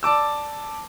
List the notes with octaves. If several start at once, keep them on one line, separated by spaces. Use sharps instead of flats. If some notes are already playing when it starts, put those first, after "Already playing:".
D5 A5 D6 E6